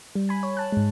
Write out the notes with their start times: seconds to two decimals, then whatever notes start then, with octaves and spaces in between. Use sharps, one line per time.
0.15 G3
0.29 G#5 B5
0.43 C#5
0.57 A5 F#6
0.72 G#2 G#3